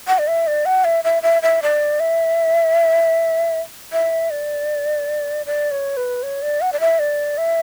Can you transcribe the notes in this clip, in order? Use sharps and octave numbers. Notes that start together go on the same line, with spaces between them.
F#5
D5
E5
D5
F#5
E5
E5
E5
E5
D5
E5
E5
D5
D5
C#5
B4
C#5
D5
F#5
D5
E5
D5
E5